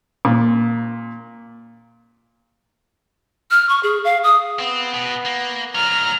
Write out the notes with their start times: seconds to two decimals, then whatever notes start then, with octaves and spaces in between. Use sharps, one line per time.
0.25 A#2
3.51 F6
3.69 C#6
3.83 G#4
4.04 F5
4.24 D#6
4.60 B3 C4
4.94 B2
5.25 A#3
5.75 D2 F#3 A#5 F6